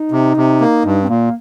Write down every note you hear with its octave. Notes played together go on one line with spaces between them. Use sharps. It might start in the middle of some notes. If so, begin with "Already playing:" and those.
Already playing: D#4
C3
C3
A#3
G2
C4
A#2 A#3